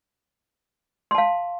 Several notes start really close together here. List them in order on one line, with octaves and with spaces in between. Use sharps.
C6 A5 F5